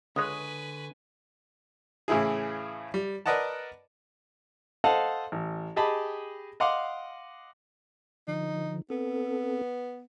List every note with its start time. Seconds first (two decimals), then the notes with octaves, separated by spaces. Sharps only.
0.16 C#2 D3 G#3 B4 C#5 G#5 D#6 F#6
2.08 A2 C#3 E3 E4 G#4
2.94 G3
3.26 A#4 B4 D5 D#5 F#5 A5
4.84 A4 C5 D#5 F5 F#5 A5
5.32 A1
5.76 G4 G#4 D#5 A5 B5
6.60 D#5 F5 F#5 C6 D6
8.28 D3 F3 D#4
8.90 B3 C4 A4